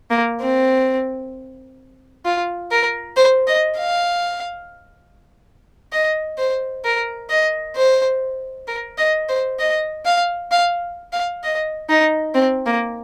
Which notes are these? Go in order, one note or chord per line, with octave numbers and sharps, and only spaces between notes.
A#3
C4
F4
A#4
C5
D#5
F5
D#5
C5
A#4
D#5
C5
A#4
D#5
C5
D#5
F5
F5
F5
D#5
D#4
C4
A#3